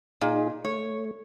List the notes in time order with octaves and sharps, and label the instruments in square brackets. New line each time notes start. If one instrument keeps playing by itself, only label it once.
[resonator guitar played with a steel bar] A#2 [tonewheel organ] D#4 G#4
[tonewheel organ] A3 [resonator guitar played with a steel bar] C#5